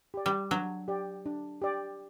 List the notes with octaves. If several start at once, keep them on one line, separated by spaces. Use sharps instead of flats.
G4 D5
G3
F#3 D4
G4 D5
D4
G4 D5